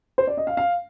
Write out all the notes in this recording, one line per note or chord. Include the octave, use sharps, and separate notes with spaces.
C5
D5
D#5
F5
F5